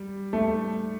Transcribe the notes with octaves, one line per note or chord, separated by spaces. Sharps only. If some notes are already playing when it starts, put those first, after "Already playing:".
Already playing: G3
A3